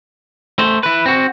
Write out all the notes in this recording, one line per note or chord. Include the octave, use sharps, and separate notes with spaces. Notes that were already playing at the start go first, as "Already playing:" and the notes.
A3 C5
E4 B4
C4 F#4